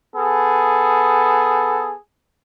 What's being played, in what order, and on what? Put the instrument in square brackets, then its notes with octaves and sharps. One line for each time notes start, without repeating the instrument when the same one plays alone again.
[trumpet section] B3 G#4 A4